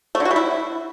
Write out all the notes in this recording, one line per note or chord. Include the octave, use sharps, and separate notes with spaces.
A3
D3
F#4
G3
E4